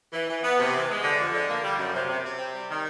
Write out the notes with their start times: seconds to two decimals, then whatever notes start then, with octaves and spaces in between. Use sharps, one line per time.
0.13 E3
0.28 E3
0.43 B3
0.58 C3
0.73 E3
0.88 G#3
1.03 D3
1.18 F2
1.33 D3
1.48 A#3
1.63 G3
1.78 F#2
1.93 C3
2.08 C3
2.24 C3
2.38 C4
2.54 G3
2.69 D#3